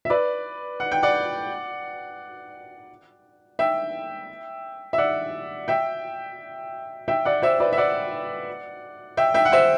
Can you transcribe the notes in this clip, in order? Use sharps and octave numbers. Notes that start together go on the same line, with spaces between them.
E5
B4 D5
F#5
G5
D5 F#5
E5 G5
E5
D5 F#5
E5 G5
E5 G5
D5 F#5
C5 E5
B4 D5
E5
D5 F#5
E5 G5
E5 G5
F#5
C5 E5